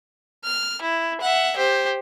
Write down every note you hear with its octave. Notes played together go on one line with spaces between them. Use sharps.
F6
E4
E5 F#5
G4 C5